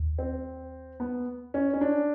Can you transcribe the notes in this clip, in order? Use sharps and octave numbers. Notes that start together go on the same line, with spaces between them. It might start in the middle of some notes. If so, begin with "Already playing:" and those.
Already playing: D#2
C4
B3
C#4
C#4
D4